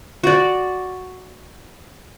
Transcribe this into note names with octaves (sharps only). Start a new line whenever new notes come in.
F#4 D5